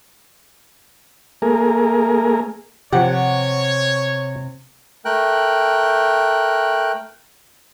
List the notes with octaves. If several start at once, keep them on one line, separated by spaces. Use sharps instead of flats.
A3 A#3 G#4 A#4
C3 F3 G4 C#5 F#5
A3 A#4 G5 F#6